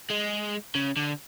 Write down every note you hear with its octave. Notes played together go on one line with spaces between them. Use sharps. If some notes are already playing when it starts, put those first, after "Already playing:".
G#3
C#3
D3